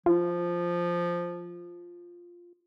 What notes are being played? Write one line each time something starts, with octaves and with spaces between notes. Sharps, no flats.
F3 F4